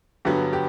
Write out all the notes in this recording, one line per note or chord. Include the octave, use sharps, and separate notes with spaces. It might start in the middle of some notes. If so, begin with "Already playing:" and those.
G2 D3 F#3 B3 G4
G4